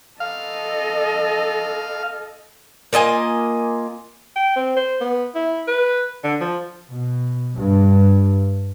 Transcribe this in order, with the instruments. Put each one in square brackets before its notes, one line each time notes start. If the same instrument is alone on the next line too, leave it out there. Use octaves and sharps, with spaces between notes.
[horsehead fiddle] A4 D#5 [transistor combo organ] F5
[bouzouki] A#3 F4 D#5 G#5
[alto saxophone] G5
C4
C5
B3
E4
B4
D3
F3
[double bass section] B2
G2